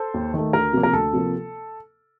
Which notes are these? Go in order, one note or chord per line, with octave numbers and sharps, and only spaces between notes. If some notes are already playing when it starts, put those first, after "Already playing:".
Already playing: A4 C5
D#2
D#3 A3
D2 A#4
C3 F3 A#3
A#4
D2 A4
C3 F3 A#3